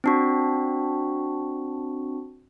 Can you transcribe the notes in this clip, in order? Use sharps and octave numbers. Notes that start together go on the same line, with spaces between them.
C4 D4 F#4